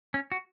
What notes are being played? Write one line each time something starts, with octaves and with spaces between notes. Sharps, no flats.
C#4
F#4